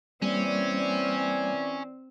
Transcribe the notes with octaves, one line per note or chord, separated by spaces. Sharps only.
E3 G3 A#3 C4 C#4 D5